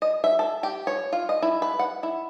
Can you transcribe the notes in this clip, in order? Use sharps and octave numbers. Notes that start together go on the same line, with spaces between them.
D#5
E5
A4
G4
C#5
F4
D#5
E4
B4
F#5
E4